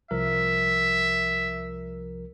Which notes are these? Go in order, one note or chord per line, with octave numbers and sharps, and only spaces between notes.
C2 F3 A#4 E5